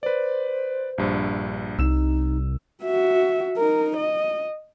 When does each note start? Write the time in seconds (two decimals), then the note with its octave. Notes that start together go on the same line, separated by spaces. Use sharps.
0.03 B4 C5 D5
0.98 A#1 G2
1.79 C2 D#4 E6 E7
2.83 F#4 E5
3.57 D#4 A#4
3.96 D#5